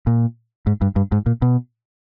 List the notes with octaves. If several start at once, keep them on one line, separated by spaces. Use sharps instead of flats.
A#2
G#2
G2
G2
G#2
A#2
B2